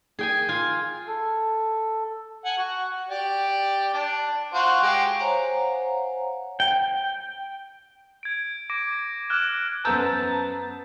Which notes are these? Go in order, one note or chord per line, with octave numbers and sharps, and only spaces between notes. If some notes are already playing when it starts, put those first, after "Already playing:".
G#4 G5 G#5
F4 G#5
A4
F#5 G#5
F#4
G4 D5
D4
F4 F#4 C5
G#3 G4
C5 C#5 F5 F#5 G#5 A#5
G5
G#6 D7
D6 A#6 D7
D6 F6 F#6 E7
F#2 B3 C5 A5 A#5 E6 G6